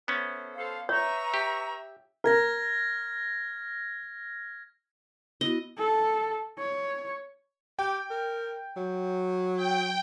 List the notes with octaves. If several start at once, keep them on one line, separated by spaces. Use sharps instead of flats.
A3 B3 C#4 A4 C5
A4 C5 F5
B4 C#5 E5 A#5 C#6
G4
A#4 F6 G#6 A#6
B3 E4 F#4 D#5
A4
C#5
G4 G5
A#4
F#3
G5